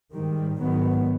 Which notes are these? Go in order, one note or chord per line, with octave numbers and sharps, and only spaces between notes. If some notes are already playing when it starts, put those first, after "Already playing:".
G#2 D#3 G3
G#2 D#3 F#3 B3